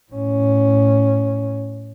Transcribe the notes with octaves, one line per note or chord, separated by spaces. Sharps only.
A2 C#4